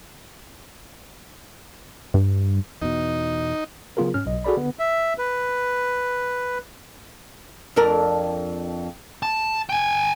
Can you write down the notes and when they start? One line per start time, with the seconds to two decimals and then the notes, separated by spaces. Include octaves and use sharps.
2.14 G2
2.82 E2 B2 D#4
3.97 C#3 F#3 B3 F4 G#4 A#4
4.14 G#2 C#4 F6
4.25 B1 D#5
4.44 F#4 G#4 A4 D5 B5
4.57 D3 B3
4.79 E5
5.18 B4
7.76 F2 D4 A#4
9.23 A5
9.69 G5 G#5